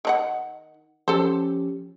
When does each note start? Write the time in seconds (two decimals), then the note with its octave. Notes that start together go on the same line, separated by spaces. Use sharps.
0.05 D#3 D4 F#5
1.08 F3 C#4 G4 A4 C5